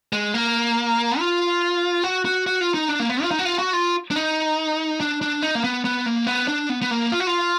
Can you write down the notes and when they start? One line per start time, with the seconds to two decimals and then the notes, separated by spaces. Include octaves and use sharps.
0.13 G#3
0.34 A#3
1.19 F4
2.04 F#4
2.25 F#4
2.47 F#4
2.61 F4
2.74 D#4
2.88 D4
3.00 A#3
3.10 B3
3.23 F4
3.31 D#4
3.39 F#4
3.45 F4
3.59 F#4
3.73 F4
4.11 D4
4.16 D#4
5.01 D4
5.21 D4
5.42 D#4
5.55 A#3
5.64 B3
5.85 B3
6.06 A#3
6.27 B3
6.48 D4
6.70 B3
6.82 B3
6.91 A#3
7.12 F4
7.20 F#4
7.27 F4